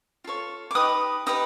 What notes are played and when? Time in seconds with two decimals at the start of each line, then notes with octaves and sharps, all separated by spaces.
0.24 F4 A4 C#5
0.71 D6
0.75 D#4 G4 B4 D#6
1.26 D#4 G4 B4 D#6